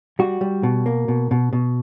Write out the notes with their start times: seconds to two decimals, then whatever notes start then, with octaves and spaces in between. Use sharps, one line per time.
0.19 G3 F#4
0.41 G3
0.63 B2
0.86 A#3
1.08 B2
1.31 B2
1.53 B2